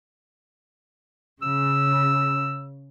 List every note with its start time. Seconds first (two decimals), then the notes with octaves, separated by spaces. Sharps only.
1.42 C#3 E6